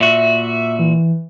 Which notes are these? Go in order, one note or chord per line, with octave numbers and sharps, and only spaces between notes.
A#2 F#4 E5
E3